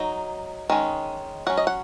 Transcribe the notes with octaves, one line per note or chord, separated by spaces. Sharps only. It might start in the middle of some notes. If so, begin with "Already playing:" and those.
Already playing: F#3 D#4
D#3 G#3 C#4
F#3 C#4 F#5
D#5
F#5